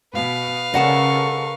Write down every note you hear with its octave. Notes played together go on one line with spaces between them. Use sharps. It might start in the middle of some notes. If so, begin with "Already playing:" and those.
B2 B4 F5
C#3 A4 A#4 D#5 F#5 A5 C#6